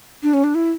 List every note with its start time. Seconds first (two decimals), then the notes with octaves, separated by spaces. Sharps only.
0.23 D4
0.34 C#4
0.44 D4
0.55 E4